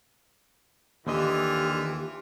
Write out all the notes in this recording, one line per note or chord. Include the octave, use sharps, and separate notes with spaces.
D#2 D3 E3 F4 G4 D#5